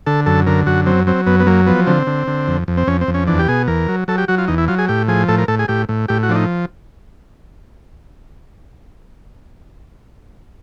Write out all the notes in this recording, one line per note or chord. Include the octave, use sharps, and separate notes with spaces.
D3 A4
F#2 A4
D3 A#4
F#2 F#4
F#3 C4
F#3 C4
F#2 B3
B3
F#3 A#3
F3 B3
D3 C4
D3
D3
F2
F2
C4
F2 C#4
C4
F2
C#4
E2 D4
G4
B2 G#4
E2 A#4
F#3
F#3 A4
G4
F#3 F#4
F4
E2 D#4
E4
F#3 F4
G#4
A2 G4
F3 G#4
A2 A4
A#4
A2 A4
G#4
A2 G4
A2
A2 G4
F#4
F3 D4
D#4